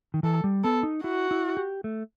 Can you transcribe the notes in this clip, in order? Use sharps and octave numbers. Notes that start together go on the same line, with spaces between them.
D#3
E3 A4
G3
B3 A4
D#4
E4 F#4
E4
G4
A3